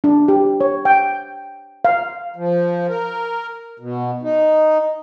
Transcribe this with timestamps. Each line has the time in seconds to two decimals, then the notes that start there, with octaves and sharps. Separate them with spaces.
0.04 D4
0.28 G4
0.61 C#5
0.85 G5
1.85 F5
2.36 F3
2.88 A#4
3.79 B2
4.22 D#4